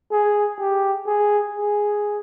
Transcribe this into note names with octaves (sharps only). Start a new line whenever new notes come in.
G#4
G4
G#4
G#4